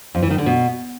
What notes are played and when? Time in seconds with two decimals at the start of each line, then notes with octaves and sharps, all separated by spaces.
0.15 F2
0.23 E3
0.30 D#3
0.38 D3
0.46 B2